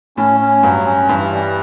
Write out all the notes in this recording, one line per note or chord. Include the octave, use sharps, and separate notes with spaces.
A2 C#4
C#4
G2 F#3
C#4
G2 E3
G3